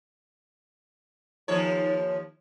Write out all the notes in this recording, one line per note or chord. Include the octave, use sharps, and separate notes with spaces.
D#2 F3 C#5